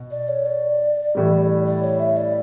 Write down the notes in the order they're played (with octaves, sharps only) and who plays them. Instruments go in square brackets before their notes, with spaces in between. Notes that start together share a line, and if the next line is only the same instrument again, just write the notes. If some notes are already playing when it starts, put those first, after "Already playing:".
Already playing: [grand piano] B2
[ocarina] D5
C#5
D5
[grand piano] A2 E3 G3
[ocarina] D5
C#5
E5
D5